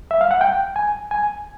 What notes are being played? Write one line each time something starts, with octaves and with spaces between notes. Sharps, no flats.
E5
F5
F#5
G5
G#5
G#5